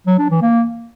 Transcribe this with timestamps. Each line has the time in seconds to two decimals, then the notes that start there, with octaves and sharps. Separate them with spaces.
0.07 F#3
0.19 D4
0.30 E3
0.42 A#3